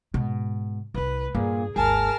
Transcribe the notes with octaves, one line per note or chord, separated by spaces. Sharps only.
G#2 B2
C2 E4 B4
G2 A#2 D4 G#4
G#1 D#2 G#4 A#4 A5 F6